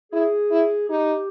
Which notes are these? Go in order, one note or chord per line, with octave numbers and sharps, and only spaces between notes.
E4 G#4
E4
D#4 G4